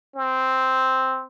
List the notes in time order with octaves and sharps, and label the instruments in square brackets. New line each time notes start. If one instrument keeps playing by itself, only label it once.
[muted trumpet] C4